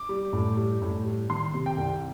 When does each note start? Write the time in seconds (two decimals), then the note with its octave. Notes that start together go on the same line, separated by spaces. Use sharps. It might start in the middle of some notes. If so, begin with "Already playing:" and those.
Already playing: D6
0.09 G3
0.33 A2
0.57 G3
0.82 A2
1.05 G3
1.29 D#3 C6
1.54 C3
1.66 G5
1.78 C2